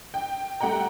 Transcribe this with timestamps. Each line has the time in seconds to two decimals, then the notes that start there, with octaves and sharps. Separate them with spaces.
0.14 G5
0.60 G3 A3 F#5 G5 A#5